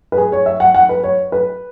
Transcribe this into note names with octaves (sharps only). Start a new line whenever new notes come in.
B4
G#4
C#5
E5
F#5
F#5
B4
C#5
B4